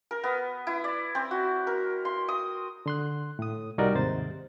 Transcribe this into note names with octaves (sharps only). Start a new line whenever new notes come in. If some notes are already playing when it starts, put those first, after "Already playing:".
A#4
B3
E4
D5
C4
F#4
A#4
C6
D#6
D3 C6 F#6
A2 D#6
C2 G3 D#4 F#4 A#4 D5
D#2 G#2 C3 C5 A6